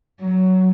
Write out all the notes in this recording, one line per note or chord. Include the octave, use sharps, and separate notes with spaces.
F#3